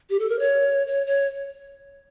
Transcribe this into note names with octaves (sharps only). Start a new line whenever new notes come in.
G4
A4
A#4
C#5
C#5
C#5